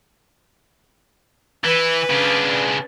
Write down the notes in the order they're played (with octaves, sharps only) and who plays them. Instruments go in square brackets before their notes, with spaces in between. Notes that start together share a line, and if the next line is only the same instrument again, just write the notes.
[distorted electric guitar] E3 [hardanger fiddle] B4
[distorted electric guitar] C#3 D4